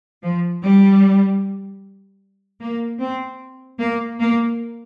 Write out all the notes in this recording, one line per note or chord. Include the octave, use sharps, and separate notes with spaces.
F3
G3
A#3
C4
A#3
A#3